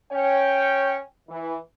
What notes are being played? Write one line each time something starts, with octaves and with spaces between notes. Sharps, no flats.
C#4 C#5 G5
E3